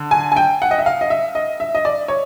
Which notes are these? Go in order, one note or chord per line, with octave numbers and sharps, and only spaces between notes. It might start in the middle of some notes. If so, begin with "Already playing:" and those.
Already playing: D3
G#5
G#5
G5
F#5
D#5
E5
F5
D#5
E5
D#5
E5
D#5
D5
C#5